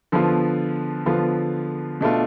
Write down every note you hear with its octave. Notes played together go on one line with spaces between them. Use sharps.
D3 F3 B3 F4
D3 F3 B3 F4
B2 A3 D4 F4